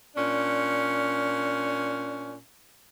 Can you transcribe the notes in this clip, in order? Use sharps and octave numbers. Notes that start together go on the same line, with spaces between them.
A#2 C#4 D4